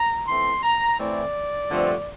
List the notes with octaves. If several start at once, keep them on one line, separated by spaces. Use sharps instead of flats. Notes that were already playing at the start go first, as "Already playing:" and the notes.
Already playing: A#5
E3 A3 C4 C6
A#5
A2 E3 A3 C4 E4 D5
G2 D3 F3 A3 C4